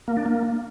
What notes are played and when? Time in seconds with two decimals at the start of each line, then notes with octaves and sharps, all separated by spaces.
0.08 A#3
0.17 D4
0.26 A#3